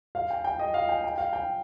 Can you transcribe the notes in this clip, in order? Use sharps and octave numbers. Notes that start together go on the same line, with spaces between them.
F5
G5
G5
D#5
F5
G5
G5
F5
G5